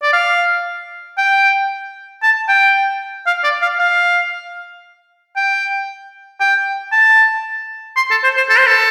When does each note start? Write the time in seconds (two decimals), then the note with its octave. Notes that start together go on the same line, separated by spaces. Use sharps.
0.03 D5
0.13 F5
1.18 G5
2.23 A5
2.49 G5
3.27 F5
3.44 D5
3.62 F5
3.79 F5
5.36 G5
6.40 G5
6.92 A5
7.97 C6
8.11 A4
8.24 C5
8.37 C5
8.50 A4
8.58 C5
8.67 A4